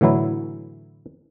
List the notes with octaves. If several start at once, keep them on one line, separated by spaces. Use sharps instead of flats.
A2 D3 E3 F#3 E4